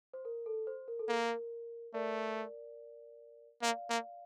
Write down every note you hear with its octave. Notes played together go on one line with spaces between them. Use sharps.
C5
A#4
A4
C5
A#4
A4
A#3 A#4
A3 A#4 D5
A#3 D5 F5
A#3